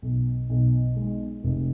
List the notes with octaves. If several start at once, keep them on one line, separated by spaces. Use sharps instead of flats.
B1
B1
G#3
F1